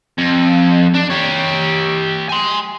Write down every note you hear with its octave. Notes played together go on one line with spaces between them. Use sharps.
F2
D4
G4 C#5
G#5 C6